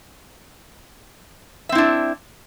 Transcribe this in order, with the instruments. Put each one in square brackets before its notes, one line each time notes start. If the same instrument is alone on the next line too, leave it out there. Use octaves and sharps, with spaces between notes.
[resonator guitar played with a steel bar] E5
C4
E4
D4